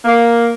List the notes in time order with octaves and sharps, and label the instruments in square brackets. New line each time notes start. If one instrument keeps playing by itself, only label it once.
[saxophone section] A#3